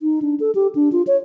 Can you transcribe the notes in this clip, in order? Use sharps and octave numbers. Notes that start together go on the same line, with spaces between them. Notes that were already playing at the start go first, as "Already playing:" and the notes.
D#4
D4
A4
G4
D4
F4
C#5